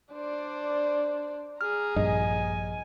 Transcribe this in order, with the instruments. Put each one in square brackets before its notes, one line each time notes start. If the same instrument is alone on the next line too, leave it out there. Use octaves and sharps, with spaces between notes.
[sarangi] D4 [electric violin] C5 D5
[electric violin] G#4 A#5 [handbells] F6
[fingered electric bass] A#1 G2 [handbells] D#5 [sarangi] G#5